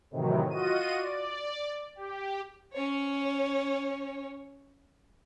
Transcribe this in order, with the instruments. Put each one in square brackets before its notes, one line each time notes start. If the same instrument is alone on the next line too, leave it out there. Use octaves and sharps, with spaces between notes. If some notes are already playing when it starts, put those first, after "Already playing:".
[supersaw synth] A2 C3 D#3 E3 F#3
F4 F#4 D#5 D#7
D5
G4
[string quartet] C#4 C#5